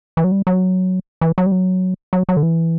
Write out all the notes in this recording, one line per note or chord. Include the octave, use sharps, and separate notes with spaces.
E3
F#3
G3
F#3
E3
F#3
G3
F#3
F#3
F#3
D3
E3